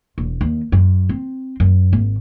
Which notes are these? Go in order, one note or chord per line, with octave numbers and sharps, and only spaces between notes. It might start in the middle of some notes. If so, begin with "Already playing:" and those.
E1
D#2
F#2
C4
F#2
G#1